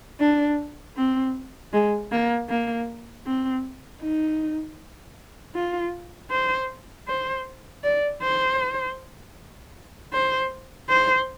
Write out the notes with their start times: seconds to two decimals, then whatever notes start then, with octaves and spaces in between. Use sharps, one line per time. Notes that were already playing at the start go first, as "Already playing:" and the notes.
0.20 D4
0.97 C4
1.74 G#3
2.12 A#3
2.49 A#3
3.27 C4
4.02 D#4
5.55 F4
6.31 C5
7.08 C5
7.84 D5
8.23 C5
10.14 C5
10.89 C5